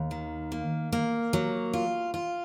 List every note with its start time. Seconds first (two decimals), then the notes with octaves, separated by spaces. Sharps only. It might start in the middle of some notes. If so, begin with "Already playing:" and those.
Already playing: D#2
0.11 D#3
0.52 A#3
0.92 A#3
1.33 F#3
1.73 F4
2.14 F4